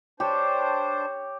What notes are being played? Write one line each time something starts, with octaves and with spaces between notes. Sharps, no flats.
D4 G4 C5 C#5